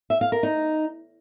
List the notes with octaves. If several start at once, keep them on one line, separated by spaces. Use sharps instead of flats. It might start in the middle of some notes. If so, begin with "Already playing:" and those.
E5
F5
A#4
D#4